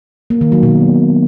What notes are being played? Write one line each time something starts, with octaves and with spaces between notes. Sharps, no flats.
A#3
D#3
F#3
B2